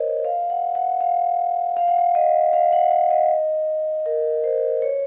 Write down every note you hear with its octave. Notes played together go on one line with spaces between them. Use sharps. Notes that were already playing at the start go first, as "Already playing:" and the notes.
Already playing: A#4 C5 C#5 D#5
F5
F#5
F#5
F5
F5
F#5
F5
D#5
F5
F#5
F#5
D#5
A#4
C5
C#5